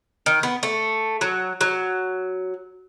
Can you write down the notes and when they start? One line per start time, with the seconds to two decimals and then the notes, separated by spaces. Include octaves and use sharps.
0.26 D#3
0.43 B3
0.63 A3
1.21 F#3
1.61 F#3